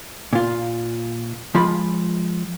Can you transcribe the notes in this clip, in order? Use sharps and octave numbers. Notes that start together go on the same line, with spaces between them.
A#2 F4
F3 G#3 F4 B5